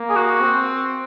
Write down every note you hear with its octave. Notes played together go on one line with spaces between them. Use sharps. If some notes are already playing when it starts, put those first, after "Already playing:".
Already playing: A#3
G#4
F#4
C4